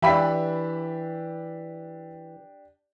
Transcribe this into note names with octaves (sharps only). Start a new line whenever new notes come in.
E3 D4 G4 E5 B5 B6